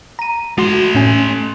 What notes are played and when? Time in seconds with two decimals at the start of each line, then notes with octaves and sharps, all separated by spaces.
0.19 A#5 D#7
0.58 G#3 A3 F#4 C6
0.95 A2 C#4 G#5